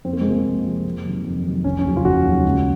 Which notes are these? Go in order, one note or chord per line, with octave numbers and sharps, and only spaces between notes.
F2 C4
A#3
G#3
C3 F3 A#3
F2
C3 F3
F2
C3 D#3 F#3
F2
C3 D#3 F#3
F1 C#4
C#4
D#2 C#3 F#3
F4
F1 F#4
D#2 C#3 F#3
C#2